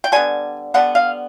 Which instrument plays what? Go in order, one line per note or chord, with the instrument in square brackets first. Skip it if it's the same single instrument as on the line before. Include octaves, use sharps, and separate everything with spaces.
[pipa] G5
D3 G3 B3 G#5
D3 G3 B3 F#5
F5